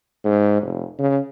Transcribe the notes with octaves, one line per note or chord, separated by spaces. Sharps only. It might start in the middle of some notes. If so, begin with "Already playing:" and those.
G#2
F1
C#3